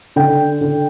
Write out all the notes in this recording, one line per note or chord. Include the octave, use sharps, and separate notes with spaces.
D3 G5
D3